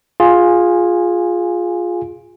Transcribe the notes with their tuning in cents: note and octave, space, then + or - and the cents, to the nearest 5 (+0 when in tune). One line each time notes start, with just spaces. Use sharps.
F4 +10 G#4 +0 G#5 -10